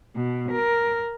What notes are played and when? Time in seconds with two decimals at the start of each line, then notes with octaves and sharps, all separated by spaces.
0.15 B2
0.51 A#4